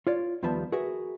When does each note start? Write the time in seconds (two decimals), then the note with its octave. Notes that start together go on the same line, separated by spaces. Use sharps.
0.07 F4 C#5 D5
0.43 D#2 F3 G3 B3 E5 A5
0.72 F#4 G#4 A#4 B4 E5